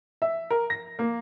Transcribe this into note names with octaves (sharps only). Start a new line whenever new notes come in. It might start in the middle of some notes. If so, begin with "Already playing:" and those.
E5
A#4
A#6
A#3